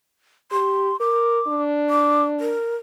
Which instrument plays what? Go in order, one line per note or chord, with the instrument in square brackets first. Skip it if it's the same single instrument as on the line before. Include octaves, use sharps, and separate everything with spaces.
[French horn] G4 [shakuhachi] C6
[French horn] A#4 [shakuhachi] D6
[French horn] D4
[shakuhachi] D6
A#4